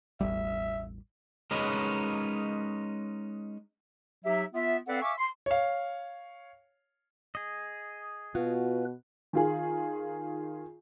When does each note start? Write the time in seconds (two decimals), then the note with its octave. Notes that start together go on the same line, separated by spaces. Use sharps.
0.21 E1 A1 G3 E5
1.51 G#3 C#4 D#4 A#4 B4 C#5
4.24 F#3 D#4 G4 E5
4.54 B3 F4 E5
4.87 C4 A4 B4 D5 F5 F#5
5.02 E5 F5 G#5 C#6 D6
5.18 C6
5.46 C#5 F5
7.35 G#4 D#5
8.35 B2 F4 F#4 B4
9.33 D#3 F4 G#4